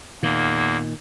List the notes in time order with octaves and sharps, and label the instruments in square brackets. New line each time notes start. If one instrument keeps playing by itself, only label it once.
[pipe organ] E2 A#3 [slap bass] A#2 D#3